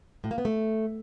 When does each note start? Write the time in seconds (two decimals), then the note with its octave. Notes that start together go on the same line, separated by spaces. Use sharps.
0.24 A2
0.31 A#3
0.38 B3
0.45 A3